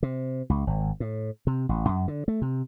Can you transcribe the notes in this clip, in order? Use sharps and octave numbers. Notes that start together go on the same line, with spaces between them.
C3
C#2
G#1
A2
C3
A1
F#2
D3
A3
C3